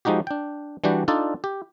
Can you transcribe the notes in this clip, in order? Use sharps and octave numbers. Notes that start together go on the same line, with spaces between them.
F3 G#3 D#4 F#4 G4
D4 G5
E3 G3 D4 F#4 G5
D4 D#4 F4 A4 D5
G4